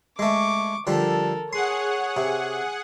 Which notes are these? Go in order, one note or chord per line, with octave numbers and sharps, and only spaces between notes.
G#3 A3 C#6 D6
D3 F3 G3 A4 A#4
G#4 C#5 F#5 C6
C3